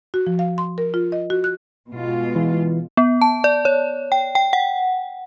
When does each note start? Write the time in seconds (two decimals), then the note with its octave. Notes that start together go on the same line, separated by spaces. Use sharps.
0.14 F#4
0.27 F3
0.39 F5
0.58 C6
0.78 A#4
0.94 F4
1.12 D#5
1.30 F#4
1.44 F#6
1.92 B2 G#3 F4
2.36 E3
2.97 B3
3.22 A5
3.44 D5
3.65 C#5
4.12 G5
4.35 G5
4.53 F#5